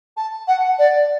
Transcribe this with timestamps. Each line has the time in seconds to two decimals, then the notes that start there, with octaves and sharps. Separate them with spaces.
0.17 A5
0.47 F#5
0.78 D5